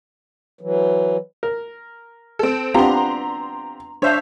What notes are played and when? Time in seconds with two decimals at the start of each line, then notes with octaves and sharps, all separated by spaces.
0.61 E3 F#3
1.43 A#4
2.39 C4 A4
2.74 B3 C4 D4 F4 G4 A#5 C6
4.02 D4 C5 C#5 E5 F5